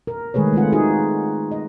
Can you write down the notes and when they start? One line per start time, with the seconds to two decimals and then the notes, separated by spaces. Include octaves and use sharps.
0.07 A#4
0.34 D#3 G#3 A3 G#4 B4 C#5
0.53 A3 C4 F4 F#5
0.72 D#4 F#4 G#4
1.52 D#5